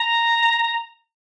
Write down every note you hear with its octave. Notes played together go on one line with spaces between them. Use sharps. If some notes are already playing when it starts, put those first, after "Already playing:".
Already playing: A#5